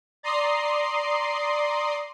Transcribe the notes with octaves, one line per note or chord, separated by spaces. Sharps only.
D5 A#5 C6 D#6 C7